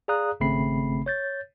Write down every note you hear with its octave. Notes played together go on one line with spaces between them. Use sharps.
G#4 D5 F5 A#5 D#6 F#6
G#1 C#3 A3 C4 B5 C7
C#5 G6 A6